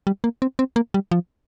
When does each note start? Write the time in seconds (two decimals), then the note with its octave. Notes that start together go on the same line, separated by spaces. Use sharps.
0.07 G3
0.24 A#3
0.42 C4
0.59 C4
0.76 A#3
0.94 G3
1.11 F3